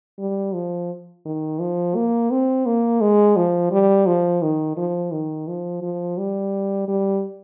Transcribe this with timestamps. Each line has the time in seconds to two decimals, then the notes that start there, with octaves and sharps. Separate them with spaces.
0.19 G3
0.54 F3
1.25 D#3
1.60 F3
1.96 A#3
2.31 C4
2.66 A#3
3.01 G#3
3.36 F3
3.71 G3
4.06 F3
4.42 D#3
4.77 F3
5.12 D#3
5.48 F3
5.82 F3
6.18 G3
6.88 G3